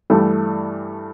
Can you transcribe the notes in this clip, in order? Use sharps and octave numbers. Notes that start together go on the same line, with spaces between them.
G2 E3 G3 A3